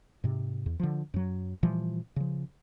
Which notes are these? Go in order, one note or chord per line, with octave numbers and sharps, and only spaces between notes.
G#2 C3
E2
D3 F3
F#2 F#3
A#2 E3 F3 G3
C#3 F3